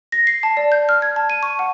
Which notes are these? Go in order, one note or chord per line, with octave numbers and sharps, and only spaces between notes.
A#6
C7
A5
D5
G6
F6
G#6
A5
D#7
C#6
F#5